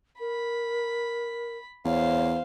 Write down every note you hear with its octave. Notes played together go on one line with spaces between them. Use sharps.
A#4 B5
E2 C5 C#5 F5